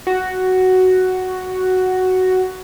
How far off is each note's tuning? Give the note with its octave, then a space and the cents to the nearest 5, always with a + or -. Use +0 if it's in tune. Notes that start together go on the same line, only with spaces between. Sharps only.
F#4 +5